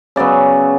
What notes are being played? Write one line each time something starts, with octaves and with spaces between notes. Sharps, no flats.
C#3 F#3 B3 D5